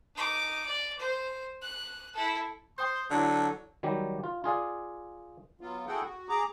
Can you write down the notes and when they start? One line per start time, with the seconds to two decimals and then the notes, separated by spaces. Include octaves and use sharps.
0.15 D#4 D6
0.66 D5
0.99 C5
1.62 F#6
2.13 E4 A4
2.78 C5 G5 C6 D#6 G6
3.11 D3 F#3 E4 D5
3.83 D#3 F#3 G3 G4
4.24 F4
4.44 F4 G#4 D5 F5
5.61 F#3 B3 F4
5.87 E4 F#4 G#4 A4 F#5 G5
6.02 F#4
6.29 G#4 A#5 D6